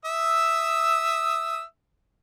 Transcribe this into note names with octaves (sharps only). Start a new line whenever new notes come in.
E5 D#6 E6